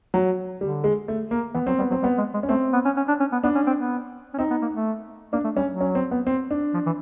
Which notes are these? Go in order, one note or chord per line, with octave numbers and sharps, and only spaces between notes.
F#3
D3 G3
G#3
A3
A#3
E3 B3
F#3 C4
G3 B3
F#3 C4
G3 B3
G#3
G#3
C#4
A3 C4
B3
C#4
C#4
D4
C#4
B3
B3 D4
C#4
C4
B3
C#4
C4 D#4
B3
A#3
A3
A#3 D4
A3
G3 C#4
F#3
C#4
C4
B3
C4
D4
F3
E3